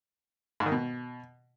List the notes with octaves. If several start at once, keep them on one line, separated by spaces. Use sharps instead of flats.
G#2
D#3
B2